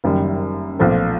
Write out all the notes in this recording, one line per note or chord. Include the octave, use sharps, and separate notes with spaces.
F#1 F#2 D#3 G3
B1 A#2 F3 A3